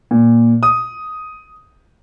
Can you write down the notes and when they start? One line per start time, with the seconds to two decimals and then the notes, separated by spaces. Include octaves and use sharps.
0.11 A#2
0.63 D#6